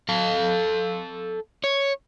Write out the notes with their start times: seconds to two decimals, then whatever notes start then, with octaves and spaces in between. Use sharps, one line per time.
0.09 A4 F5
1.64 C#5